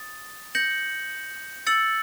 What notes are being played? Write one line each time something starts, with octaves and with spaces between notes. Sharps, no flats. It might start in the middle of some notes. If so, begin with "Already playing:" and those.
Already playing: D#6 A6
G6 A#6 C#7 F#7
E6 A6 C#7 F#7